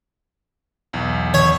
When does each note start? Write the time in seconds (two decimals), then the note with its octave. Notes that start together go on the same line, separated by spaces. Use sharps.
0.93 B1 E2
1.34 C#5